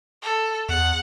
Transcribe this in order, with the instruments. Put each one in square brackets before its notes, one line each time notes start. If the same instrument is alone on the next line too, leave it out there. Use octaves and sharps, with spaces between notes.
[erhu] A4
[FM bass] E2 [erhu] F#5